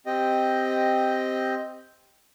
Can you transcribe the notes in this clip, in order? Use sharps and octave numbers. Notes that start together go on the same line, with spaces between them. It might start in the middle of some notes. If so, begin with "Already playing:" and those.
C4 G4 D#5